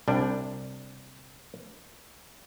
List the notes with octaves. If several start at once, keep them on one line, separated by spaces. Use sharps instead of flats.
C2 G3 D4